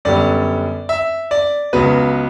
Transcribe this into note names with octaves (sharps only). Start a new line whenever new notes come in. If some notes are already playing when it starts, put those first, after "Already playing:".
F#2 D3 G3 B3 D5
E5
D5
C#2 C#3 F#3 B3 B4